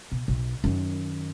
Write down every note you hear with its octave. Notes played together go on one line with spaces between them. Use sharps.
B2
B1
F#2 D#3